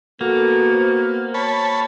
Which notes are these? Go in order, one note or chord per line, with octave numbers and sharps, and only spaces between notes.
A#3 B3 F#4 A4
C5
C#5 A5 B5